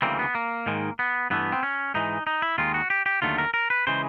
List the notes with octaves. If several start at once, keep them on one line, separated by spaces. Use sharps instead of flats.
D2 C#3 E3 G3 A#3 C4
B3
A#3
G#2 D#3 G#3
B3
G2 E3 A3 B3
C4
C#4
G#2 E3 G#3 D#4
D#4
E4
D#2 D#3 G#3 F4
F#4
G4
G4
D#2 D3 F#3 A3 F4
A#4
A#4
B4
C#3 E3 G#3 C5